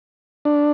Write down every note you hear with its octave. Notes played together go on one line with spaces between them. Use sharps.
D4